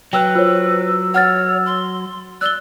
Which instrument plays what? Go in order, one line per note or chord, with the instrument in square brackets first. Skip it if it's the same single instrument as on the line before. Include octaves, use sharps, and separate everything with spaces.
[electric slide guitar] F#3 [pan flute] B4 [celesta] G5 E6 F#6
[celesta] F4 C5 C#5 [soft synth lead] E6
[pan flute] C#5 [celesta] F#5 F6 A6
[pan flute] C6
[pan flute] D5 [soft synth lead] E6 [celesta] F#6 G7